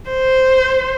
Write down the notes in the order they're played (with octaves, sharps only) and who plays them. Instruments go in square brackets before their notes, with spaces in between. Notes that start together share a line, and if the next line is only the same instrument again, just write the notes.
[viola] C5